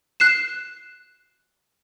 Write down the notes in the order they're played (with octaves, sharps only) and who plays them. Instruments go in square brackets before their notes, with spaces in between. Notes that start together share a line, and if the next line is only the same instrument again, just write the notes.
[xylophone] F#6 C7 E7